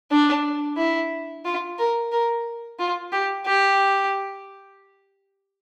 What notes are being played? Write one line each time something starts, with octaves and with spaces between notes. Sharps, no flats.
D4
E4
F4
A#4
A#4
F4
G4
G4